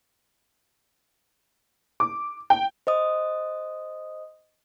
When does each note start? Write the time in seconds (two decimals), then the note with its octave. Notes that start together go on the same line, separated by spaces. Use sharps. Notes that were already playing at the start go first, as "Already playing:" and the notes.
2.00 D6
2.50 G5
2.87 C5 D#5 D#6